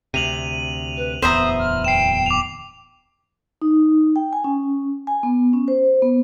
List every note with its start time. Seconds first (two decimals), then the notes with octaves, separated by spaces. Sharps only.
0.14 D2 C3 D#7 F7 F#7
0.96 B4
1.22 D1 E2 B3 C5 E5 A#5 D#6
1.58 F6
1.85 G5 C7 E7
2.26 D6 F7
3.62 D#4
4.16 G5
4.33 G#5
4.44 C#4
5.07 G#5
5.23 B3
5.53 C#4
5.68 C5
6.02 B3